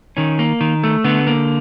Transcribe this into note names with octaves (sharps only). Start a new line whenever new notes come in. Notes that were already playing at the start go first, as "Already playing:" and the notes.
D#3 C#4
A#3
D#3
A3
D3 B3
A#3